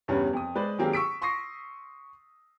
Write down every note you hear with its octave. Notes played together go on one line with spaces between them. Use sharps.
E2 G2 C#3 G3 C#4
F2 D#6
G#3 B4 C5 D5
D#3 F#3 A#3 C4 G4 G#4
C#6 E6 B6 D7
C6 C#6 D#6 A#6 C7